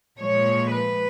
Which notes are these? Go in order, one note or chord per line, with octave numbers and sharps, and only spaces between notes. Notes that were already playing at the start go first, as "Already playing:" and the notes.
A#2 F3 G#3 C#5
B4